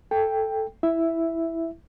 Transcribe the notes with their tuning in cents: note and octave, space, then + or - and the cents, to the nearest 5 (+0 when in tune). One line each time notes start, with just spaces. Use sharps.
A4 +0 G5 +10
E4 +0 E5 +0